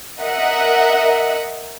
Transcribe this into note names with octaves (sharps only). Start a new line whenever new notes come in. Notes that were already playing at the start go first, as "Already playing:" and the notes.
A#4 D#5 E5 F#5